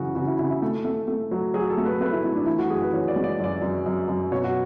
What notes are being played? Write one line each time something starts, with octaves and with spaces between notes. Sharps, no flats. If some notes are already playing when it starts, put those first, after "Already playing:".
Already playing: F#2 C#3 E3 F#4 G#4
C#3 F#4
E4
C#3 E4
E4
A3
A3
A3
F#3
F#3 G#4
A4
A3
B4
A3 B4
E4
A3 E4
D4
E3 E4
F#4
F#2 G#4
B4
E3 C#5
D5
G#3
D5
F#2 D5
F#2
F#2
F#2
B2 C#5
F#4